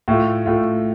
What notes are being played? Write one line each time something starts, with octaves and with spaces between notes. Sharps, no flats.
A2 A3 F4
A2 A3 F4